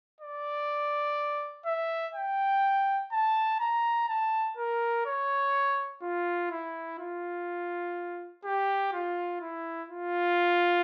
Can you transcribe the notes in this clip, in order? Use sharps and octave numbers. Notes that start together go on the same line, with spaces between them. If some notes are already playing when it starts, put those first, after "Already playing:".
D5
E5
G5
A5
A#5
A5
A#4
C#5
F4
E4
F4
G4
F4
E4
F4